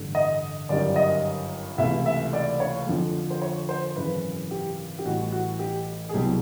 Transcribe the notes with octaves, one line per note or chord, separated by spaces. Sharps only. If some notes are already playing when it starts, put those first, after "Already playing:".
Already playing: A1 G2 D3
D#5
G1 F#2 D#3 G3 D5
D#5
C#2 C3 E3 A3 E5
E5
D5
C#5
F2 D3 F3
C5
C#5
C5
G#1 F#2 C#3 E3 B4
G4
G4
A1 A2 E3 G3 F#4
F#4
G4
G#4
C2 B2 F#3 G4